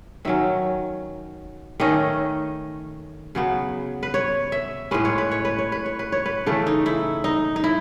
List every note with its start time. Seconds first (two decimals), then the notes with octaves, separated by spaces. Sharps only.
0.25 D#3 F#3 C#4 E5
1.80 D#3 A3 C#4 D#5
3.35 C#3 F#3 B3
4.03 B4
4.14 C#5
4.52 E5
4.91 A2 G#3 C#4 B4
5.05 C#5
5.18 B4
5.31 C#5
5.45 B4
5.58 C#5
5.72 B4
5.86 C#5
5.99 B4
6.12 C#5
6.26 B4
6.46 C#3 E3 A3 A4
6.67 D#4
6.86 E4
7.24 D#4
7.56 D#4
7.64 E4